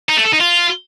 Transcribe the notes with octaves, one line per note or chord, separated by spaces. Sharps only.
D#4
A3
A4
D#4
F4